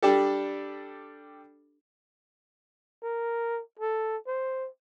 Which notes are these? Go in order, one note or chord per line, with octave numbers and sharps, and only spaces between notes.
G3 D4 G4 A4
A#4
A4
C5